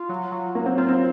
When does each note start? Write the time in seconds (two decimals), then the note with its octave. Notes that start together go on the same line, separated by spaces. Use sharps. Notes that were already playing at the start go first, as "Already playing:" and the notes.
Already playing: F4
0.09 F#3
0.32 F#3
0.55 F#3 A#3
0.66 C4
0.78 C4 F4
0.89 C4